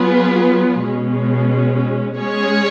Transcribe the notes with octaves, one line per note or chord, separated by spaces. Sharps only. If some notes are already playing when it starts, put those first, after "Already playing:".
Already playing: F#3 B3 F4 G#4 B4
B2 G#3 C#4
G#3 C#4 G#4 C#5